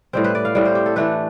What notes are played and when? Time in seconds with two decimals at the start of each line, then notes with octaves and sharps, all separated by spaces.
0.13 A2 G3 C4 C5
0.24 B4
0.35 D5
0.45 F5
0.55 A2 G3 C4
0.65 C5
0.75 G4
0.86 A4
0.96 E3 A3 D4 B4